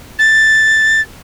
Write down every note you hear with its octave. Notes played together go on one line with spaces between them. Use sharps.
A6